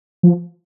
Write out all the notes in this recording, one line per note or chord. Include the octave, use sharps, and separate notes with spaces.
F3